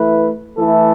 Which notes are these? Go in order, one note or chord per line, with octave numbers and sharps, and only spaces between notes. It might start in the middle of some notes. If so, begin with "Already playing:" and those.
Already playing: E3 A3 E4 B4
E3 A3 E4 A4